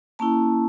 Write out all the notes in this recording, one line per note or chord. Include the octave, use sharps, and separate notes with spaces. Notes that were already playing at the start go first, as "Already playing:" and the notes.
A#3 C#4 E4 A5